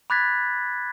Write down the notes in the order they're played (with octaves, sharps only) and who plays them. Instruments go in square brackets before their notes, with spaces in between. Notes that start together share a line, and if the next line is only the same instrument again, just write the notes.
[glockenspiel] B5 D6 F#6 G#6 A6 B6